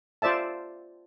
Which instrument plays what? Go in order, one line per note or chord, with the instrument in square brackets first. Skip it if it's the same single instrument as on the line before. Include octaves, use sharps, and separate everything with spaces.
[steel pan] F4 C5 D5 E5 A5